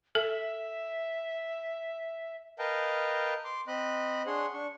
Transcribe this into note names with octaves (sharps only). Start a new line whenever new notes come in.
A4 E5
A#4 B4 D#5 F5 G5 A5
C6 D6
C4 D#5 B5 F#6
D4 G#4 C#5 F#5 C6
D4 C#6